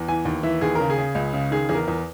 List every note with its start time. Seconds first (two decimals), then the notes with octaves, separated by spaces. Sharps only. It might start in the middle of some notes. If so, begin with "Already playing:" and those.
Already playing: E2
0.08 E3 G#5
0.25 D#2
0.43 E3 E5
0.61 D#2 G#4
0.75 C#3 A#4
0.90 G#4
0.98 C#3
1.15 C#2
1.33 C#3
1.51 D#3 G#4
1.69 E2 G#4
1.75 A#4
1.88 E2